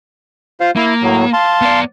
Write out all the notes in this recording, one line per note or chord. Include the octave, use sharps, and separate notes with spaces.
F4 C5 F5
A#3 E4
A2 F#3
F5 A5 C6
B3 D5